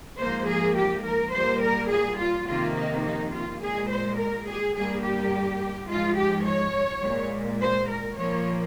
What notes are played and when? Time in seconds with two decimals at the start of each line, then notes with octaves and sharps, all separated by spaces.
0.20 G#2 F3 A#3 C5
0.48 G#4
0.77 G4
1.05 A#4
1.34 A#2 G3 A#3 C5
1.62 A#4
1.91 G#4
2.19 F4
2.47 F2 C3 D#3 A#3 F4
2.76 D#4
3.05 D#4
3.34 F4
3.62 A#2 G#3 G#4
3.90 C5
4.19 A#4
4.48 G#4
4.76 G2 G3 A#3 G#4
5.04 G4
5.90 G#2 F3 G#3 F4
6.18 G4
6.46 C#5
7.04 A#2 G#3
7.61 C5
7.90 A#4
8.18 A#2 F3 A#3 C#5